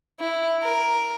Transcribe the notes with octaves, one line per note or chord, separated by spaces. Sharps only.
E4
A#4